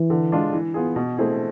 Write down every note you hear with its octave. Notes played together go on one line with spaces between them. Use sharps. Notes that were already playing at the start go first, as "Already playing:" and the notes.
Already playing: E3
D3
G#3 D4 F4
E3
B3 F4 G#4
B2
A3 C4 E4 G#4